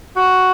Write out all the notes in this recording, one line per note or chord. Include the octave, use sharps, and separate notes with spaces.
F#4